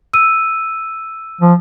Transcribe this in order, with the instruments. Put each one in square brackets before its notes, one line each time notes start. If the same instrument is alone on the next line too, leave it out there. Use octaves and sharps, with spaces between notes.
[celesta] E6 D#7
[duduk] F3